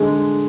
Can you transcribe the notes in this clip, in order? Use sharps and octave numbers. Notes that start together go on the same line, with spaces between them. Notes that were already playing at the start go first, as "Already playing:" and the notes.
Already playing: D3 G#3